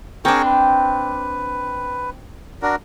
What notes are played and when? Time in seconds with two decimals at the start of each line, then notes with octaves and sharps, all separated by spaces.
0.25 C4 D4 G#4 A#4 C#6
0.45 B4
2.62 D4 F#4 A#4